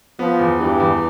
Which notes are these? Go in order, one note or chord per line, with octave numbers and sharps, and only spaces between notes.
F3 B3
E2
G2 E3
E2